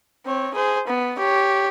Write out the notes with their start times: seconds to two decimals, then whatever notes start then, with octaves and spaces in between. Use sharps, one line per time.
0.26 C4 C#5
0.54 G#4 C5
0.88 B3
1.19 G4 C#5